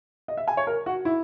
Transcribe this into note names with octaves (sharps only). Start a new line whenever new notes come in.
D#5
E5
G#5
C#5
A#4
F#4
E4